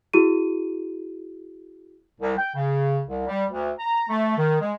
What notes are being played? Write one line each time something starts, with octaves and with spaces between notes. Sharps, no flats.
E4 F#4 G#4 D#7
C2
G5
C#3
C2
G3
D2
A#5
A3
D#3
G#3